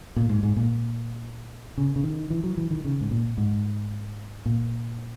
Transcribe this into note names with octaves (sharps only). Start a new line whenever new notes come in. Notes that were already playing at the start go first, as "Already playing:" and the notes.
A#2
G#2
G#2
A#2
C#3
C#3
D#3
E3
F#3
E3
D#3
C#3
G#2
A#2
G#2
A#2